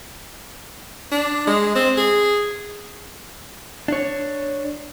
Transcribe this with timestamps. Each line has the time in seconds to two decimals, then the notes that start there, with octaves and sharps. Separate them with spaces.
1.12 D4
1.47 G#3
1.75 C4
1.97 G#4
3.88 D4 C#5